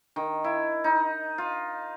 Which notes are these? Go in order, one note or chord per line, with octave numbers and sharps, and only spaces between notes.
D#3
E4
D#4
F4